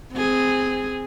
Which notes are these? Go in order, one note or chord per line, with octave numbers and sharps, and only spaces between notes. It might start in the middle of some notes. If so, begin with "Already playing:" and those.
C4 G#4